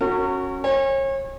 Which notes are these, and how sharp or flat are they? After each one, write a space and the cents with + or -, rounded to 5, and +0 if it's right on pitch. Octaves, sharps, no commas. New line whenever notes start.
C#4 -15 F#4 +0 A#4 -40
C#5 -35 G#5 -40